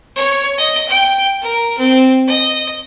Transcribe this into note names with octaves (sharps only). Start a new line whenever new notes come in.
C#5
D#5
G5
A#4
C4
D#5